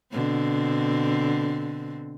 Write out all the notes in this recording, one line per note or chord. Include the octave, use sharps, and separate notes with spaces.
B2 D3 C4